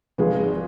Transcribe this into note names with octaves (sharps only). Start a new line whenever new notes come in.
G#1 G#2 F3 G#4 B4